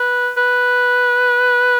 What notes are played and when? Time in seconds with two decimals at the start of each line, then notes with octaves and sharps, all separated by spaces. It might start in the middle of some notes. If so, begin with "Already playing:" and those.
Already playing: B4
0.37 B4